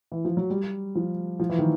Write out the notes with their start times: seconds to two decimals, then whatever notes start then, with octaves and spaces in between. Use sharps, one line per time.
0.12 E3
0.25 F3
0.37 F#3
0.50 G3
0.95 F3
1.40 F3
1.49 E3
1.59 D#3